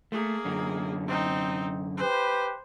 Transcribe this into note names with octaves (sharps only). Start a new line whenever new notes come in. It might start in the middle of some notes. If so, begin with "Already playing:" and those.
A3 A#3 G#4
F#2 D3
C4 D#4
G4 B4 C5